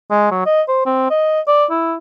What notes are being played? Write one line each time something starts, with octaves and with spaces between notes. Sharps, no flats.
G#3
F#3
D#5
C5
C4
D#5
D5
E4